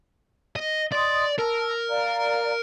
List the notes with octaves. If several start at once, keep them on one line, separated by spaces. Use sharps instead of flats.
D#5
D5 D#5 C6 D#6
A#4 A5 E6
D5 F5 A#5